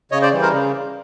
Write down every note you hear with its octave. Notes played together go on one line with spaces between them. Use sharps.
C#3 C#5 D#5
C5 D5
E3 G3
A#4 C5
C#3